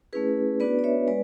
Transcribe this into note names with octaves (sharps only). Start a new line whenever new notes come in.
A3 C#4 E4 G#4 B4
B3 D4 F#4 B4 D5
D5
C#5 E5
G#3 B4 D5